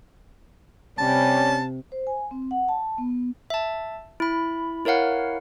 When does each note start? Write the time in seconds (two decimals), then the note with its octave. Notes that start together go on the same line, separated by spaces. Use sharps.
0.98 C3 G3 C#4 A5
1.92 C5
2.07 G#5
2.31 C4
2.51 F#5
2.69 A5
2.98 B3
3.10 B3
3.50 E5 A5
4.20 E4 B5
4.85 E4 A#4 C#5 F5 F#5